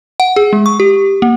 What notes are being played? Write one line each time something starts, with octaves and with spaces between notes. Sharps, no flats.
F#5
G#4
G#3
C#6
G4
A#3